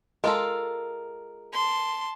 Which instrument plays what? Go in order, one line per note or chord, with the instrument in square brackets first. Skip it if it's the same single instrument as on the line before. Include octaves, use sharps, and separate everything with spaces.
[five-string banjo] G#3 F4 A4 [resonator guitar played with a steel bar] A#4
[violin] A5 C6